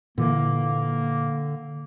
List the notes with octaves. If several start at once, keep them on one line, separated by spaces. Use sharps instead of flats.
A#2 D3 E3 A#3